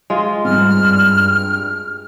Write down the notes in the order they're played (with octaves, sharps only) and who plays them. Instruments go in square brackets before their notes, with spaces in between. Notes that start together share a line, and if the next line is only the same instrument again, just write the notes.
[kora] G#3 F4
[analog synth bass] G#2 [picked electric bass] G3 C4 [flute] F6
[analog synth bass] G2